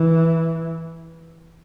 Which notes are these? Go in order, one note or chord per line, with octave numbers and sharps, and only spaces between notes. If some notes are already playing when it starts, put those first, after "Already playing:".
Already playing: E3